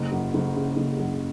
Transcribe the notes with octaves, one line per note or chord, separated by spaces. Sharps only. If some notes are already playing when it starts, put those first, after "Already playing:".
Already playing: F#1
F#2
F#1
C#3
F#1
F#2